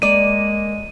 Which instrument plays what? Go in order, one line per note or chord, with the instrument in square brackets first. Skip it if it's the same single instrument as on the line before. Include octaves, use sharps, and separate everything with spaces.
[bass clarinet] G#3 [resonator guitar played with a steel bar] A#3 D5 [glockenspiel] D#7